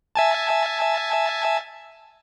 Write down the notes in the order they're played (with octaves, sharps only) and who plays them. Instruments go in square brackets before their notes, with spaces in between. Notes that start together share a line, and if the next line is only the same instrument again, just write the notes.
[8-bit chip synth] E5 G#5 A5